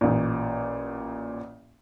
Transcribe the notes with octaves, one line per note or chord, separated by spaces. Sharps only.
A1 A#2